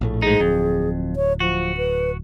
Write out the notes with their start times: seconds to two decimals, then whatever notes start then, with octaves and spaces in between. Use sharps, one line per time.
0.01 A#1 A2 A3
0.22 G#2 D#4 G#4
0.40 D1 F2
1.16 C#5
1.40 F3 F#4
1.77 B4